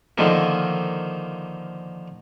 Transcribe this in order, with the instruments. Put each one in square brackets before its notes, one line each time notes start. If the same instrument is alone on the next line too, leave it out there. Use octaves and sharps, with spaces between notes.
[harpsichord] D3 D#3 F3 A#3